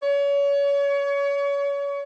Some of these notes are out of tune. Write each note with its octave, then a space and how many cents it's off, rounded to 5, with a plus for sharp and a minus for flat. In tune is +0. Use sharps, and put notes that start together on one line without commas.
C#5 +30